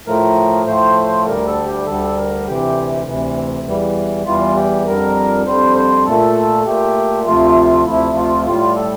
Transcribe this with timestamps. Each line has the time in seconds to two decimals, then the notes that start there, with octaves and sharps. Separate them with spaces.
0.07 A2 F3 A3 A#4
0.67 A2 F3 A3 C5
1.27 D2 D3 G3 A#4
1.47 A4
1.66 G4
1.87 D2 D3 G3 A4
2.17 A#4
2.46 D2 C3 E3 G4
3.06 D2 C3 E3
3.66 E2 E3 G3
4.26 E2 E3 G3 F4
4.56 G4
4.86 F2 D3 G3 A#4
5.46 F2 D3 G3 C5
5.76 C5
6.06 A#2 A3 A4
6.66 A#2 A3 G4
7.26 D2 C3 F3 A3 F4
7.86 D2 C3 F3 A3 E4
8.16 F4
8.46 A2 G3 F4
8.76 A4